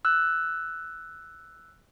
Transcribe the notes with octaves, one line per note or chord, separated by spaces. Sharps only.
E6 F#6